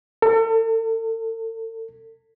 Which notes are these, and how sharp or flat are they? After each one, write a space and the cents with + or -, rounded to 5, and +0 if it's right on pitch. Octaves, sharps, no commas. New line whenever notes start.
A4 +40